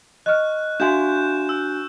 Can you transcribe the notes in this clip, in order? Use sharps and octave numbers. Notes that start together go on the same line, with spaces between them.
D#5 C#6 F6 F#6
D4 F#4 E5 F5 G#5 C6 G6 E7
E6